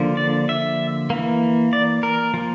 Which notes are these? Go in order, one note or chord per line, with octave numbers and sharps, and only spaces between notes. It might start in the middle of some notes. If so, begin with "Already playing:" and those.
Already playing: D3 F3 A#3
D5
E5
E3 A#3
D5
A#4
F3 A#3